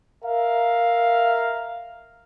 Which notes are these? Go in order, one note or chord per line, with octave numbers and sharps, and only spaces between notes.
A#4 E5 F5